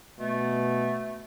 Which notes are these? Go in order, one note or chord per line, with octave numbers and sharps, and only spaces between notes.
B2 A3